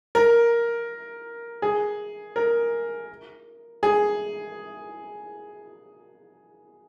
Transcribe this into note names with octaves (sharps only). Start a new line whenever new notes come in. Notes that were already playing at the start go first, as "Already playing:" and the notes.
A#4
G#4
A#4
G#4